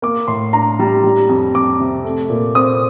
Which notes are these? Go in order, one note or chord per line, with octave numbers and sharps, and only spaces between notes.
A#3 D6
A2 C6
D4 A#5
G3
G3
F2
F2 D6
C3
A3
A#2
C4 D#6